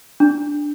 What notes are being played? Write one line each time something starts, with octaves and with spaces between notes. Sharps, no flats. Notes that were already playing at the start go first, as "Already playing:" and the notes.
D4